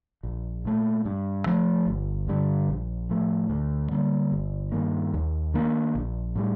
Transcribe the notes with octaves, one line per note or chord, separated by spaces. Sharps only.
A#1
A#2 A3
G2
F3 A3
G1
G2 D3 G3
A#1
A2 F3 A3
D2
D3 G3 A#3
G1
G2 D#3 A#3
D#2
D#3 A#3 D4
A#1
A2 G3